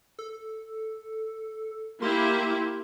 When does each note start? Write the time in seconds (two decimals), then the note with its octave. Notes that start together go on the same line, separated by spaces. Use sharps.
0.19 A4
2.02 A#3 E4 G4 C6